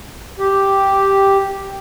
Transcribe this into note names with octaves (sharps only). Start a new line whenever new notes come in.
G4